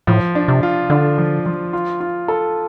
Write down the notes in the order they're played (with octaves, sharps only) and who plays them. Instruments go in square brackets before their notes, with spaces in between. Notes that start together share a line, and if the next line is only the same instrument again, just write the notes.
[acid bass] A2 [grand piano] F3
[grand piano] D4
[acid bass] C3
[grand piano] F4
[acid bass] D3 [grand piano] D4
[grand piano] F3
F3
F4
F4
A4